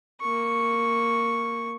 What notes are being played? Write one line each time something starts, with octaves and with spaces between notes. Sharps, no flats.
A#3 C#6